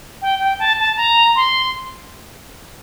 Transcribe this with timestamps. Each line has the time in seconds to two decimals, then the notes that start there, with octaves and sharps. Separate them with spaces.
0.22 G5
0.41 G5
0.60 A5
0.79 A5
0.97 A#5
1.36 C6